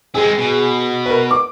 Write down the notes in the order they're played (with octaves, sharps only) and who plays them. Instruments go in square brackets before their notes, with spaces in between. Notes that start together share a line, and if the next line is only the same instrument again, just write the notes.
[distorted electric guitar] G#3 C4 [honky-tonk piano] G#4
[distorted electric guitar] B2
[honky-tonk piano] A#4 B4
D6